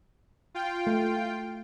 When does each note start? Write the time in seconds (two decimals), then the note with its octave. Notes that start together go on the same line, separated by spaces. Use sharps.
0.54 F4 G5
0.87 A3